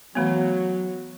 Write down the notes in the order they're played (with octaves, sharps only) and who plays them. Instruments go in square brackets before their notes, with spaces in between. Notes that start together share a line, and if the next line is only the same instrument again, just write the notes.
[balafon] E3 A3 B3 [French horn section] F#3